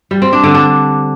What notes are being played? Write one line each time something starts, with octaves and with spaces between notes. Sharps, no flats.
G3
C4
D4
D3
D4